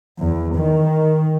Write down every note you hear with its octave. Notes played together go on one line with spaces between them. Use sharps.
E2
D#3